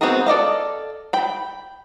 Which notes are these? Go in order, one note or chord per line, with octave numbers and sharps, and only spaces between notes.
B3 C4 F#4 G#4 A#4
A4 D5 D#5 F5
G5 B5